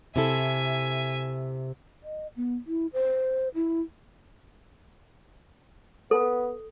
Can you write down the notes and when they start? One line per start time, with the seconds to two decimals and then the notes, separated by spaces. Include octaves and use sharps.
0.16 C3 E4 A4 E5 G#5
2.03 D#5
2.36 B3
2.67 E4
2.93 C5
3.55 E4
6.11 B3 A4